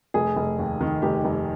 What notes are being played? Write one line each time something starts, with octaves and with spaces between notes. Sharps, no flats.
F1 G#4
F1
D#2
D#3
F1 G4
F1